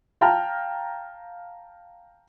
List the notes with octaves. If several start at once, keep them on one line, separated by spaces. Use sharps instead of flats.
F5 G5 A5 A#5 F6